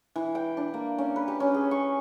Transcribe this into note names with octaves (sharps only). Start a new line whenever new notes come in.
E3
G5
D4
A#3
C#4
B4
G4
C#4
G#4
C#6